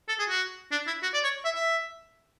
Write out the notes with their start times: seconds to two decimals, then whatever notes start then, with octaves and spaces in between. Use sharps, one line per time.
0.09 A4
0.19 G#4
0.29 F#4
0.72 D4
0.87 E4
1.03 F#4
1.14 D5
1.24 C#5
1.45 E5
1.55 E5